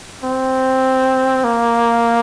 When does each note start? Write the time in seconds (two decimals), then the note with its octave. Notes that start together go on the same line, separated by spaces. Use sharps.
0.24 C4
1.44 A#3